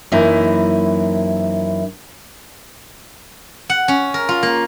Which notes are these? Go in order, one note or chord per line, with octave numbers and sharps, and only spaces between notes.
F#2 E3 A#3 D#4 E4 C5
F#5
C#4
A#4
F4
A#3